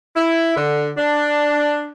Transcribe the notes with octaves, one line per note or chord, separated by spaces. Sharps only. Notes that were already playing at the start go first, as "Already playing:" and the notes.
E4
D3
D4